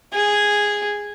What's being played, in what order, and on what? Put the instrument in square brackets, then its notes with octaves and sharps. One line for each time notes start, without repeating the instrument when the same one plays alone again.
[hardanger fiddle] G#4